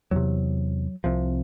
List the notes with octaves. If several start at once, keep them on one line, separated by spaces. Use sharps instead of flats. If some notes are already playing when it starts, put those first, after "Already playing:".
E2 C3 F#3
C2 C3 F3